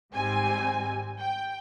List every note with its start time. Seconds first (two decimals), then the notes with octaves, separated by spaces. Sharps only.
0.13 G#1 G#2 G3 C4 G#5
1.18 G5